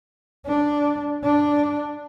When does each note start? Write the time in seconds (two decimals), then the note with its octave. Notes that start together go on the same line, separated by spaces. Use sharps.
0.46 D4
1.24 D4